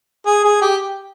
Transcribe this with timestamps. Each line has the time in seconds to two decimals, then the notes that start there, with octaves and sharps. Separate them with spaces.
0.26 G#4
0.45 G#4
0.61 G4